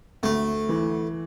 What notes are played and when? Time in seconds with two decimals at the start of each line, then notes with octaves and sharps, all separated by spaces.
0.23 D2 A3
0.69 E3